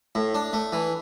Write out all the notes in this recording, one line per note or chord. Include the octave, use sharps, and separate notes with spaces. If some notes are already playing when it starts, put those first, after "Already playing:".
A2
D4
A3
E3